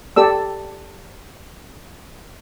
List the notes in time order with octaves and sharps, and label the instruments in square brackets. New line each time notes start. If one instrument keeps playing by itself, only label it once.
[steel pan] G4 A4 D5 E6